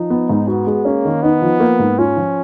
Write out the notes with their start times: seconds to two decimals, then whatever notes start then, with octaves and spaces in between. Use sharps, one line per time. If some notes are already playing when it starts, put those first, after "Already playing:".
Already playing: F3 D#4
0.10 B3
0.29 G#2
0.48 B3 F#4
0.67 G#3
0.85 A#3 C#4
1.05 D#3
1.23 B3 D#4
1.42 F3
1.60 A#3
1.79 G#2
1.99 C#4 F4
2.17 F3